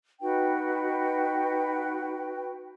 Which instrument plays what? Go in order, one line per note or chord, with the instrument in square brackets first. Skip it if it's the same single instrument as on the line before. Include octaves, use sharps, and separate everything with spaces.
[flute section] D#4 F#4 B4 G5